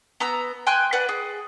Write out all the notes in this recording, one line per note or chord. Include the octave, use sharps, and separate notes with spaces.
B3 A#5 E6
G5 G#5 C6 F#6
B4 D5 F#5
G#4